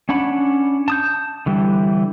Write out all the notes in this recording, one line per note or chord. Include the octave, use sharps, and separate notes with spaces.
C#4 D4 F#5 B5
A5 D#6 G6
D3 E3 G3